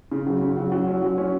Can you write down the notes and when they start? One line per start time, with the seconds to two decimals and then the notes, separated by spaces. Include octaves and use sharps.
0.12 C#3
0.27 F#3
0.41 C#3
0.57 F#3
0.72 F#3
0.88 C#4
1.02 F#3
1.18 C#4